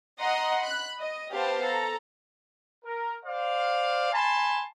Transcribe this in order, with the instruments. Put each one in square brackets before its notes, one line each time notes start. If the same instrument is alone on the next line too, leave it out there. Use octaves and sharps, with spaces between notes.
[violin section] D#5 F#5 A#5 C6 D#6
B5 F#6
D#5
B3 G4 C5 F5 A5
A4 A#5
[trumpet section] A#4
C5 D5 F5
G#5 A5 B5 C6